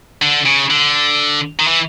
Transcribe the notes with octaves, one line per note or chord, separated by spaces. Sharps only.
D3
C#3
D3
D#3
E3